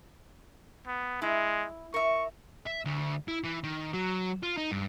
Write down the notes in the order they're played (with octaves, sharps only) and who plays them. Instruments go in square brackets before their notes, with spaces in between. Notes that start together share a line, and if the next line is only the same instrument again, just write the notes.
[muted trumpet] B3
[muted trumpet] G#3 [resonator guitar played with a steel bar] E4
[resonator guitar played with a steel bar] A#4 E5 [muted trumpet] C#6
[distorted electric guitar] E5
D2
E4
E3
D#3
F#3
F4
D#4
G2